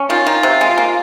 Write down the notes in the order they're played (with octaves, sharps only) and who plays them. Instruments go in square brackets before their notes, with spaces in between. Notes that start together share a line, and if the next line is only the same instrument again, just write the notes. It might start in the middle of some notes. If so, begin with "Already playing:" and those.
Already playing: [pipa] C#4
[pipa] D#3 [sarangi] F4
[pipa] D#3
C3
G#3
A#3